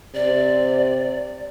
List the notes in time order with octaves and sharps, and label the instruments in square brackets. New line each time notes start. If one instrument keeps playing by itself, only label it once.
[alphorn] C3 [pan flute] D5